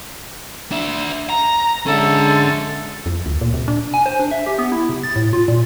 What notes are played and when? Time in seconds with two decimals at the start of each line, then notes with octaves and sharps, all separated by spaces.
0.72 D4 E5
1.30 A#5
1.87 D3 G#3 C#4 A4 E5
3.06 F2
3.26 D2
3.41 A#2
3.54 C3
3.68 D4
3.94 G#5
4.06 C5
4.19 D4
4.31 E5
4.46 G4
4.58 B3
4.72 E4
4.89 C3
5.04 A6
5.16 A2
5.33 F4
5.48 A#2